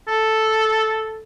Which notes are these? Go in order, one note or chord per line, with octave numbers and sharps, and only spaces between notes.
A4